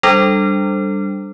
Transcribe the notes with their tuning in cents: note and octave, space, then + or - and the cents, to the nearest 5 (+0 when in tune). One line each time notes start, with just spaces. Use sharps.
G3 +0 D4 +0 A4 +0